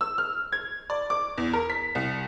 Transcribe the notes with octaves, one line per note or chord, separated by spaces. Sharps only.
E6
F6
G#6
D5
D6
E2
A#4
B6
C2